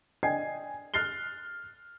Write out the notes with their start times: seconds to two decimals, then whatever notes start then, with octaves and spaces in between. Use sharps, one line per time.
0.23 D5 D#5 G5 G#5 G#6 C7
0.94 F6 F#6 A6 C7 G7